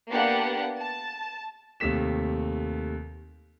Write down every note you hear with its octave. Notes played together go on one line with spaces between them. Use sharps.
A#3 B3 D4 G4 F#5
A5
D#2 C3 A3 B6 E7